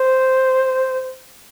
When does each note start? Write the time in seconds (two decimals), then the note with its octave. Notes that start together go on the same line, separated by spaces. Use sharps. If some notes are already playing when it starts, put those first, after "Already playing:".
Already playing: C5